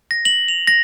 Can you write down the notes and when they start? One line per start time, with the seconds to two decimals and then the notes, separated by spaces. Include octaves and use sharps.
0.11 A#6
0.25 F#7
0.48 F7
0.67 A#6